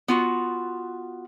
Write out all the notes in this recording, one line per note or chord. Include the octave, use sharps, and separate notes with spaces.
B3 F4 F#4